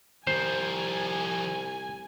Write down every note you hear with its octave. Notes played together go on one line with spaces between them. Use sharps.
C2 D#3 F3 C5 G#5